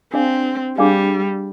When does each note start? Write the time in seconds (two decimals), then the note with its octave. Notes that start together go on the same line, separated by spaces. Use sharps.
0.13 C4 D4 G#4 D5 F5 G#5
0.78 G3 D4 G#4 D5 F5 G#5